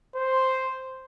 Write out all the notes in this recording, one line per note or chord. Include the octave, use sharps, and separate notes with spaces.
C5